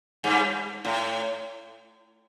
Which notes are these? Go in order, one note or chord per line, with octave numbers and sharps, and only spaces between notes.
G2
A2